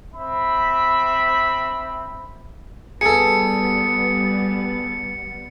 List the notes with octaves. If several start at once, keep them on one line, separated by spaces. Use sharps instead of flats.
C4 E5 B5
G3 B3 G#4 A4 C#7